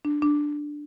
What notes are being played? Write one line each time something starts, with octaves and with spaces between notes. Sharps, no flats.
D4
D4